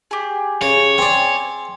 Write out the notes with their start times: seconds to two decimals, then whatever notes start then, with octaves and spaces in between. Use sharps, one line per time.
0.11 G4 G#4
0.62 C#3 C#5
0.98 C4 G#4 D5